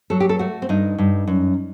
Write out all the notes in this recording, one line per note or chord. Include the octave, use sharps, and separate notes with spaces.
F#3 A4
G4
A4
A3 F#4
C4
G2 D#4
G2
F#2